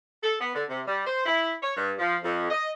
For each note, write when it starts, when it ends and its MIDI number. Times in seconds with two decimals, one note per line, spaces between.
0.22 0.35 69
0.41 0.52 59
0.55 0.64 50
0.69 0.80 48
0.86 1.03 55
1.06 1.23 72
1.26 1.53 64
1.62 1.74 73
1.76 1.92 43
1.99 2.16 53
2.24 2.46 41
2.51 2.69 75